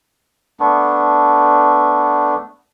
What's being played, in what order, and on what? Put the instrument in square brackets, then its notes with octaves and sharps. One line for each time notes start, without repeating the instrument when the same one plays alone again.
[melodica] A3 B3 D4